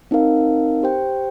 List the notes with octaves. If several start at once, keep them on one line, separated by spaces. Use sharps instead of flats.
C4 D#4 A#4 F5
G4 C5 G5